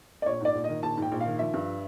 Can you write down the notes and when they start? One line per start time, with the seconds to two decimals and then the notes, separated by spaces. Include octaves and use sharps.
0.22 D5
0.26 A#1 C#5
0.40 G#2 D5
0.55 A#1
0.64 D#3 D#5
0.83 A#1 A5
0.97 G#2 G5
1.12 A#1
1.21 F5
1.26 D#3
1.39 F3 E5
1.54 G2